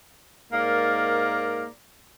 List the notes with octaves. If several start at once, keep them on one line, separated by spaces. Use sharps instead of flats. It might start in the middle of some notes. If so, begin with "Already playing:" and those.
G#2 A#3 A#4 D5